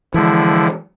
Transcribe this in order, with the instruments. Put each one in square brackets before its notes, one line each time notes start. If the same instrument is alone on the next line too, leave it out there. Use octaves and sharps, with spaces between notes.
[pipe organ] D3 F3 E4 [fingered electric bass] E3 G#3